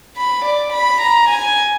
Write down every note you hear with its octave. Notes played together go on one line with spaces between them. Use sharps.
B5
D5
B5
A#5
G#5